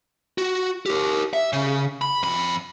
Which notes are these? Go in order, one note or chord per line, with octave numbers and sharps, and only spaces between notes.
F#4
G4 A#4
E5
C#3
B5
F2 B5